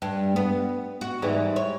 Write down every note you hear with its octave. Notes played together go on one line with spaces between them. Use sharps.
G2
B3
F#4
G#2 E3 G3
C#5